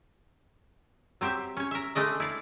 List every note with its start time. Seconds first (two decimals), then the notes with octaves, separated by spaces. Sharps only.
1.21 F#3 C4 G4 E5
1.57 C#4 C#5
1.71 A#4 E5
1.95 G#3 A3 D4 D#5
2.20 E4 D5 F5